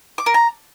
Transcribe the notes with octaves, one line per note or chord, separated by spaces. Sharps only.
D6
A#4
A#5